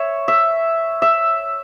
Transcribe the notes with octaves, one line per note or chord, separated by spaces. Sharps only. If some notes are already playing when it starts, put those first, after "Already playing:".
Already playing: C#5 E5
E5
E5